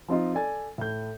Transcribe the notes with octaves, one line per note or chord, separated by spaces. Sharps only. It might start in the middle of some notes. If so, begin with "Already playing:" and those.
F3 C4 D#4 F4
A4 D5 G#5 A6
A2 G6